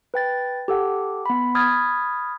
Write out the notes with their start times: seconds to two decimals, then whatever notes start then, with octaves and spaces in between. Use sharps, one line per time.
0.14 B4 G5 A6
0.68 G4 A4 F#5
1.26 B3 B5
1.55 B5 D#6 F6 G#6 A6